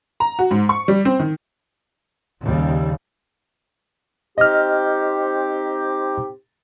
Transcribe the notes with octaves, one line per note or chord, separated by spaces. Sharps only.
A#5
F#4
G#2
C#6
G3
C4
D#3
D#2 C#3 G3
C4 D#4 G4 D#5 F6